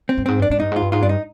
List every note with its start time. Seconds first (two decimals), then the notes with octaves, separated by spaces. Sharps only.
0.09 C4
0.18 G2
0.26 G#2 C4
0.39 G2 D4
0.50 G#2 D4
0.60 G2 D#4
0.72 G#2 F4
0.82 G2
0.92 G#2 F4
1.03 G2 D4
1.09 D#4